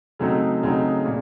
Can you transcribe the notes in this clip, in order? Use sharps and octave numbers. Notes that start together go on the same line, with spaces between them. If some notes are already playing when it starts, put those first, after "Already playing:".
C#3 F#3 A3 C4 D#4
C#3 F#3 A3 C4 D#4
A#2